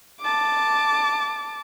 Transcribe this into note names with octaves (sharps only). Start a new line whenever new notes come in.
A5 D6